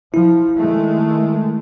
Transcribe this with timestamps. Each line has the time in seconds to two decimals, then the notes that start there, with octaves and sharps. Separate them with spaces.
0.14 F3 E4
0.59 D#3 G#3 A3